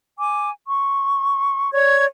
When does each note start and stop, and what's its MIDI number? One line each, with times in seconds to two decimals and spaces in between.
0.18 0.51 80
0.18 0.51 86
0.68 1.70 84
0.68 1.70 85
1.73 2.05 73
1.73 2.05 74
1.73 2.05 85
1.73 2.05 92